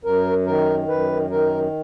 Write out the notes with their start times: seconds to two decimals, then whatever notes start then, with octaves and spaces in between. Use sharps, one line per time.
0.04 F#2 A#4
0.46 D#3 A#4
0.88 F#2 B4
1.30 D#3 A#4